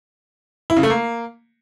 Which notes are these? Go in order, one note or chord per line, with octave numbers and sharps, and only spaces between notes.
E4
C#3
A3
A#3